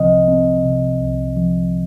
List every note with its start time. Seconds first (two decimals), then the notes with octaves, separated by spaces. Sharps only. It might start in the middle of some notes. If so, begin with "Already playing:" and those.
Already playing: C2 C3 F3 C4 D#5
0.28 C4
0.65 C3
1.01 C2
1.37 F3